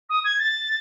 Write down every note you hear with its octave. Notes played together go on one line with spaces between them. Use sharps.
D#6
G#6
A6